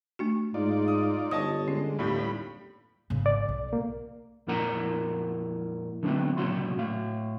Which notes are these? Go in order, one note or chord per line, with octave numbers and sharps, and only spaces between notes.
A3 D4 F#4
G#2 D#4 F4 D5
D#6
G1 C#5 D#5 A5 D#6
D3 G#3 C#4
G1 D#2 A2 G3 B5
G#1 C#3
D5
B1
A#3
F2 A#2 E4 A#4 F#5 A#5
D3 F#3 A3 B3 C4 E4
C2 A#2 C#3 F#3 F#4 C6
A2 F5